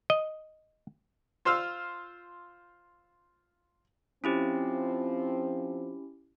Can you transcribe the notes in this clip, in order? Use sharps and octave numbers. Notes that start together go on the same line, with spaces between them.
D#5
F4 C5 F5 E6 F6
F3 C4 C#4 E4 G4